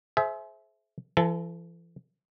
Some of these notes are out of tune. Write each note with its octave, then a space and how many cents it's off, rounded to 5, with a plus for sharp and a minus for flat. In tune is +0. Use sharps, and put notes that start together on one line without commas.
G#4 +35 C5 +0 E5 +0
E3 +45 A4 +0